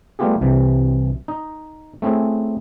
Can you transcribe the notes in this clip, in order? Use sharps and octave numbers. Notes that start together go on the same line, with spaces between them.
G3 A3 B3 F4 G4 G#4
C2 C3 E3
D#4 D#5
A3 C4 C#4 E4 G#4